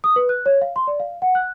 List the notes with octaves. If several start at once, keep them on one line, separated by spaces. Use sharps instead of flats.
D#6
B4
F#6
C#5
F5
C6
D5
F5
F#5
F#6